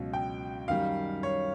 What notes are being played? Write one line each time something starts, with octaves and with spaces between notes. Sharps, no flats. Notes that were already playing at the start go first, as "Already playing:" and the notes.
Already playing: C#2 B2 F#3
G5
F#2 D#3 G3 F5
C#5